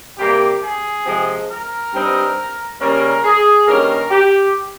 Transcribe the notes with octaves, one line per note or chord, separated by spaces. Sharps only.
C3 G3 A#3 G4
G#4
C3 F3 G#3
A#4
G2 G3 C4 D#4
C#3 G3 A#3 C#4 A#4
G#4
G2 D#3 A#3 C#4 A#4
G4